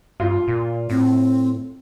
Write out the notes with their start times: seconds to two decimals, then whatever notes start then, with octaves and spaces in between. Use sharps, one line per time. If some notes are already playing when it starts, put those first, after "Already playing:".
0.20 G2 F4
0.48 A#2
0.90 A2 C4